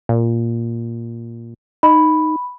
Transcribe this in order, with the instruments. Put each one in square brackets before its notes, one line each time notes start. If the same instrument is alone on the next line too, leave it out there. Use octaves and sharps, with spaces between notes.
[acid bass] A#2
[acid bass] D#4 [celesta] B5